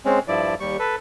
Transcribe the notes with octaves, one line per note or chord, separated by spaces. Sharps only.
G#3 C4 C#4
G2 F3 E4 D5
D#2 G3 C#6
A4 B4